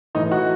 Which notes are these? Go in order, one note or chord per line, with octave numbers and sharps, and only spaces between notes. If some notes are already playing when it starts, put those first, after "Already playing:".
A2 E3 A3 D#4 D#5
F#4 F#5